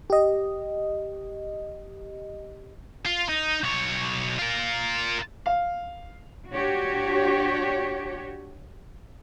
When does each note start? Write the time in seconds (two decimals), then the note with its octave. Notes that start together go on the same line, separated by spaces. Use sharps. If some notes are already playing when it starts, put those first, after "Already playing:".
0.10 G4 D#5
3.05 F4
3.29 D#4
3.63 B1 C#5
4.39 F4 A#4
5.46 F5
6.51 D4 F#4 G4 C#5